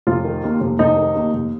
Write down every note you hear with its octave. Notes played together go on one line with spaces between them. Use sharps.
F1 F4
D#3
D#2
F1
F1 D#4
D#3
D#2
F1